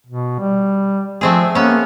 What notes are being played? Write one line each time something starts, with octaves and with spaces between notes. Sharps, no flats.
B2
G3
F3 A3 C4 G#4
A#3 B3 C#4